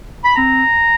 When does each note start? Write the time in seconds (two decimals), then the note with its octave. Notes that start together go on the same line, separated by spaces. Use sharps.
0.25 B5
0.36 C4 A#5